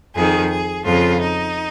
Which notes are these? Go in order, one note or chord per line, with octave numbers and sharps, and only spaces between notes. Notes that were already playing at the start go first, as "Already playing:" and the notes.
F2 D#3 G#4
G#4
F2 C#3 F4
D#4